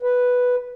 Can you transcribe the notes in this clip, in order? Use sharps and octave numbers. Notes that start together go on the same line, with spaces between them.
B4